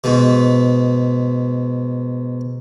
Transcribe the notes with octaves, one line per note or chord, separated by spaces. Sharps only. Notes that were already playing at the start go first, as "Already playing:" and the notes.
G#2 B2